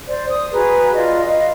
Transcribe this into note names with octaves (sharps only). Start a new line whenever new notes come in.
C5 D5
D#6
F#4 G#4 B4 A#5
F4 D5 D#5
D#5 F5